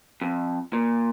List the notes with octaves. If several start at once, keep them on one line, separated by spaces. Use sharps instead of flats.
F2
A#2